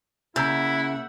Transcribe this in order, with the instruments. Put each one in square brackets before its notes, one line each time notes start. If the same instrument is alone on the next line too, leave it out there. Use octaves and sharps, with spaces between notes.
[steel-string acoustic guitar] C#3 [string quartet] A#3 E5 F#5 [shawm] E4 [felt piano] A#5 E6 G6